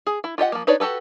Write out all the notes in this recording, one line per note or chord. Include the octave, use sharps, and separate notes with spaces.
G#4
E4
F4 G4 D#5 F#5
F3 A#3
D4 D#4 B4 C#5 D5
F#4 G4 A4 B4